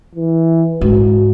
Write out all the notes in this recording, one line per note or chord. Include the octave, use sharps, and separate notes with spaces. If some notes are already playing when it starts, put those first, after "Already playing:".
E3
G#2 F#4